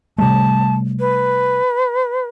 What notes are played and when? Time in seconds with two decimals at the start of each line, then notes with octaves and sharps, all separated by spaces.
0.18 C3 G3 A3 A5
1.00 B4